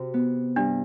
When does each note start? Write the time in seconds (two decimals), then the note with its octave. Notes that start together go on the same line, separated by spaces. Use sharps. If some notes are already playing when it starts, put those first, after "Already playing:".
Already playing: C3 F#4
0.14 B3
0.56 G2 D4